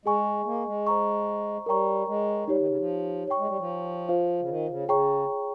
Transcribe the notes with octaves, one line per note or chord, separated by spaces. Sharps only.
G#3 G#4 D#5 G#5 C#6
A#3
G#3
C5 D#5 A#5 C#6
G3 A#4 C#5 G5 A#5 C#6
G#3
G3 D#4 G4 C#5
D#3
C#3
F3
C#5 G5 C#6
G#3
G3
F3
F4 C5 F5
C#3
D#3
C#3
C#3 G#4 C#5 G5 A#5 C#6